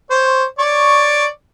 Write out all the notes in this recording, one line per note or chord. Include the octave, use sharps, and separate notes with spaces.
C5 C#5
C#5 D5 C#6